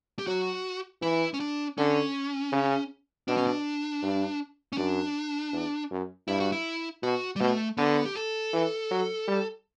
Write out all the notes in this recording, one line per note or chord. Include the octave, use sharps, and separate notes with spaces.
G4
F#3 F#4
E3 E4
C#4
D4
D3 C#4
C#3
B2 D4
C#4
D4
G2
C#4
F#2 D4
E2
F#2
G2 E4
F#4
E4
B2 F#4
G3
B2 A3
D3 B3
G4
A4
E3
F#3
G3